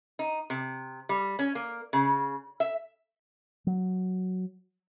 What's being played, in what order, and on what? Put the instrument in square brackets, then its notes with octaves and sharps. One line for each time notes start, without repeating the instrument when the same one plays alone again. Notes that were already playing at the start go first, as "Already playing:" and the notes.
[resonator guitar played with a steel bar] D#4
C3
G3
C#4
A#3
C#3
E5
[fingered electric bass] F#3